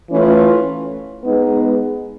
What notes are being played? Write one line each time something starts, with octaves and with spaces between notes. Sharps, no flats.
E3 A3 C#4 F4
G#3 B3 D#4